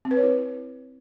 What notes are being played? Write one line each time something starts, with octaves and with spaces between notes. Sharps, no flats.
C4
B4
C#5
E4